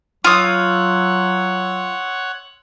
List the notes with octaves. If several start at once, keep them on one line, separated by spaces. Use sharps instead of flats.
F#3 F4 C#5 F#5 C6 D#6 E6